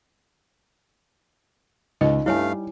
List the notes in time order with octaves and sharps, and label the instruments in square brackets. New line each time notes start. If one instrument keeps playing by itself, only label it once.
[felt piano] C#2 [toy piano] D#4 [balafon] D#5
[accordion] G2 A3 F5 [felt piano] G3 [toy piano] E4 C#5 G#5